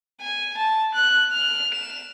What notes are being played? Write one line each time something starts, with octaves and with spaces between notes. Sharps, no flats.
G#5
A5
F#6
F6
E7